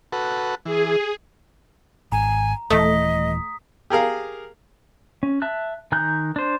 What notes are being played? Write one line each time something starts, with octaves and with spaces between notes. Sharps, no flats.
F#4 A4 B4
E3 G#4
G#1 G#5 A#5
D#1 E3 A3 D#5 D#6 B6
G4 G#4 A#4 F5
C#4
E5 A5 F#6
D#3 G#5 A#5 F#6 G6
D4 C5